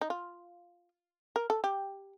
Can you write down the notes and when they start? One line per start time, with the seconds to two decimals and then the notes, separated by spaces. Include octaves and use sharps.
0.01 D#4
0.10 F4
1.36 A#4
1.50 A4
1.64 G4